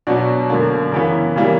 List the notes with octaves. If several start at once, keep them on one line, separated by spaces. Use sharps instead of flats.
B2 F#3 B3 D4
F#2 D3 A#3
C#3 E3 B3 A#4
C#3 E3 G3 A#3